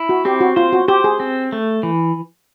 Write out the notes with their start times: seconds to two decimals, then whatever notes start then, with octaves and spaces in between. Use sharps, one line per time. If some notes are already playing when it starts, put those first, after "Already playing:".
Already playing: E4
0.09 F#4
0.25 C4 G4
0.41 F#4
0.56 F4 C5
0.73 F#4
0.88 G4 C5
1.04 G#4
1.20 C4
1.52 A3
1.83 E3